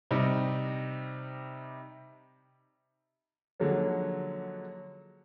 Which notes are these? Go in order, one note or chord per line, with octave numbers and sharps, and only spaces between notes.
C3 G3 D#4
D3 F3 F#3 G#3 A#3 C#4